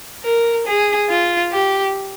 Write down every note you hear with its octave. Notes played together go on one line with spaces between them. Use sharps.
A#4
G#4
F4
G4